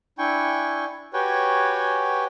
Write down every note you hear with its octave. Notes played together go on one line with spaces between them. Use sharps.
D4 E4 G5 G#5 C#6
F#4 G4 B4 C#5 G5 G#5